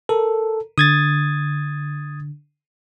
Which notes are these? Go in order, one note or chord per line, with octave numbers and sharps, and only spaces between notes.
A4 A#4
D3 D#6 G#6 A6